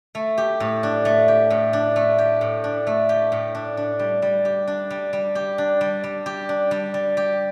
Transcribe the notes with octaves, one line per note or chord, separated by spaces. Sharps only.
A3
G4
A2
D4
A3
G4
A2
D4
A3
G4
A2
D4
A3
G4
A2
D4
D4
G3
G3
G4
D4
G3
G3
G4
D4
G3
G3
G4
D4
G3
G3
G4